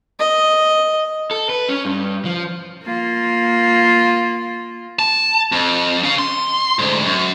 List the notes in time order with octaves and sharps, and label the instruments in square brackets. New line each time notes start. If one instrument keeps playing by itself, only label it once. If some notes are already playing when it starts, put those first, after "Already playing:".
[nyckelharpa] D#5
[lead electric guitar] A4
B4
C#4
G2
F3
[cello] A#3 F4
[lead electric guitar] A5
F2
C#4 F5
C6
D2 G#2
F#2